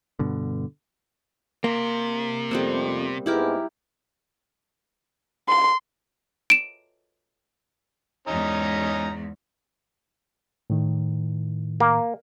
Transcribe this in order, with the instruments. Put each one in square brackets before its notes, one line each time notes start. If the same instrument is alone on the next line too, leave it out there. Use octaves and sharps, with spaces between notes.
[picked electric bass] G2 B2 D3
[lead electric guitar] C3 [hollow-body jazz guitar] A#3
[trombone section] F2 A3 [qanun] G3 B3 C4
[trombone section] G#2 G#3 B3 [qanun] E4 G4 A#4
[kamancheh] C6
[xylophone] D7 E7
[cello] E2 G#2 [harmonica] C#4 D#4 A#5
[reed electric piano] A2 D#3
[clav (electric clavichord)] A#3